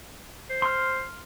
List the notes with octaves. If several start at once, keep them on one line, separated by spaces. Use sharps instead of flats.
C5
C6 F6